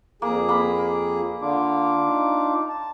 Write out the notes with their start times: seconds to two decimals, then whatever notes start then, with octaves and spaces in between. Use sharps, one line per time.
0.22 F2 A#3 G#4
0.49 A#3 B5
1.42 D3 D4 F4 D6
2.06 D#4
2.69 A5